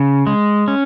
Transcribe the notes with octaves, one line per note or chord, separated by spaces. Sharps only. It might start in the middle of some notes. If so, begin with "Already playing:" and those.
Already playing: C#3
G#3
C#4